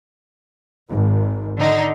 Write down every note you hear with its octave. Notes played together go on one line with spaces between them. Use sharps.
G#1
D3 D#4